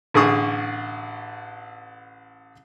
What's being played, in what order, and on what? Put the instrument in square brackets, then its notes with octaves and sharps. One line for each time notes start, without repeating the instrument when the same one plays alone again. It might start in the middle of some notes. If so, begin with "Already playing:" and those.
[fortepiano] A1 D3 G#4 C#6 D#6